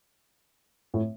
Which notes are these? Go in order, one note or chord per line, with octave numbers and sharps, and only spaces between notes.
A2